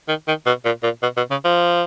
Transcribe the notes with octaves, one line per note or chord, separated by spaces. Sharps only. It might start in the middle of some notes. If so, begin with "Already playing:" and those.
D#3
D#3
B2
A#2
A#2
B2
B2
C#3
F3